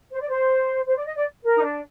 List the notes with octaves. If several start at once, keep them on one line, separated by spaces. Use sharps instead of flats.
C5
D5
C5
C5
D5
D#5
D5
A#4
D#4
D4